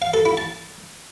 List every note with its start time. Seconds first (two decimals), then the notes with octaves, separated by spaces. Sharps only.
0.02 F5
0.14 A4
0.25 E4
0.37 A5